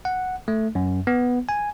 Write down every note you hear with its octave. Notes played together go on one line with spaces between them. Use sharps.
F#5
A3
F#2
B3
G#5